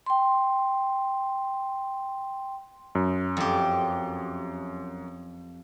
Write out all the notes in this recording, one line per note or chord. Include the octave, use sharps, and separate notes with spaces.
G5 C6
F#2
F2 G4